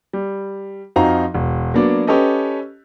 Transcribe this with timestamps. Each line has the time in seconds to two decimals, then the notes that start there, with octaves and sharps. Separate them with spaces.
0.13 G3
0.96 F2 F3 D#4 F#4 F5 A#5
1.34 E1
1.74 F#3 A#3 B3 D4 D5
2.07 C#4 G4 A4 B4 D#5